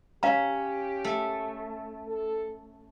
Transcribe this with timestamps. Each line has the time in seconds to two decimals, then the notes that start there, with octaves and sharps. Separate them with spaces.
0.23 C#4 G4 F5 A#5
1.04 A3
2.07 A4